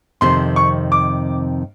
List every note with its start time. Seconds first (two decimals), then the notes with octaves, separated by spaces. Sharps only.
0.21 F2 C3 D#3 C6
0.56 C#6
0.92 D6